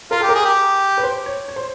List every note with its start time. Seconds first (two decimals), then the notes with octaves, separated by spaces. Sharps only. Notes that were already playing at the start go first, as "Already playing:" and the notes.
0.11 F4 A#4
0.20 G4 A4
0.29 A#4
0.35 G#4
0.45 G4
0.98 B4
1.03 C5
1.26 C#5
1.48 C#5
1.56 C5